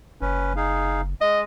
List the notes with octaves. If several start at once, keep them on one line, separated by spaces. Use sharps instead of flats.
F#1 C#4 B4
D#4 G#4 F5
G#3 D#5